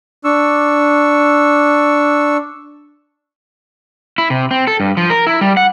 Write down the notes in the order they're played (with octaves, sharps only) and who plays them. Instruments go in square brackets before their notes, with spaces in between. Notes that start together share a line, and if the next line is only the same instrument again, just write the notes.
[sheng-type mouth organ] D4 C#6 E6
[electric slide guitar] E4
C3
C4
A4
G2
F3
A#4
E4
G3
F#5